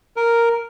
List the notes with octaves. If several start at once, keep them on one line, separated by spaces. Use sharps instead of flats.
A#4